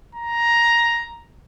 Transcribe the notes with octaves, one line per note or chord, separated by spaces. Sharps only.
A#5